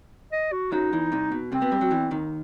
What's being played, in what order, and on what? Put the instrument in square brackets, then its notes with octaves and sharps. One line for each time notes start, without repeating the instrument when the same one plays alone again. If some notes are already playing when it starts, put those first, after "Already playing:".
[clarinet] D#5
F#4
[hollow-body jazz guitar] F#2 F#3 [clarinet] D#4
[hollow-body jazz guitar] E2 E3
C2 C3
B2
[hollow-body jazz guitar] C2 C3 [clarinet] C4
[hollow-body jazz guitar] B2 B3
G2 G3
F#2 F#3
E2 E3
D#2 D#3